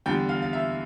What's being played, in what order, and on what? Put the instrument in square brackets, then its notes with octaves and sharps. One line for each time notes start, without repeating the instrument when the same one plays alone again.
[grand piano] E2 D3 G3 G5
F5
F5
E5